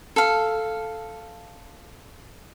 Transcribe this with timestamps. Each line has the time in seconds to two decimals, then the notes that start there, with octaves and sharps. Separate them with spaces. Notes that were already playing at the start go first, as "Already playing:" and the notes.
0.16 A4 F5